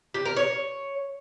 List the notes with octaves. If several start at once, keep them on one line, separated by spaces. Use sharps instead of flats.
G4
A#4
C#5